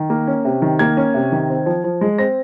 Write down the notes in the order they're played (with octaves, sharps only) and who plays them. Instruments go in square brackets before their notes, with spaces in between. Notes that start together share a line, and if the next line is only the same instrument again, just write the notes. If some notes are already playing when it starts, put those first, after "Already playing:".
Already playing: [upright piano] D#3
A#3
C#4
C3
D#3
A#3 G#6
C#4
C3
D#3
C4
F3
F3
G#3
C4 A#6